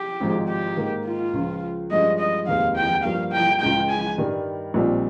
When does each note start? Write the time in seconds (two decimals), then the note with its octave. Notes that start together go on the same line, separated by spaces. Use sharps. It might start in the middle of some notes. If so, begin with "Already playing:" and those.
Already playing: G4
0.21 G#1 G#2 F3 G#3
0.49 G4
0.76 G#2 D#3 A#3
1.06 F4
1.33 C#2 C#3 F3
1.91 G2 F3 G#3 C#4 D#5
2.19 D#5
2.47 F1 D#2 D#3 G#3 C4 F5
2.76 G5
3.04 G2 F3 A#3 F5
3.32 G5
3.61 C#2 C#3 G#3 G5
3.90 G#5
4.18 G2 D#3 G3
4.74 A#1 A#2 G3 C4 D#4